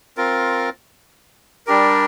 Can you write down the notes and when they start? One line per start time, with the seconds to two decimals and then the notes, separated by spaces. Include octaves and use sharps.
0.17 C4 F4 A#4
1.67 G3 D4 G4 A#4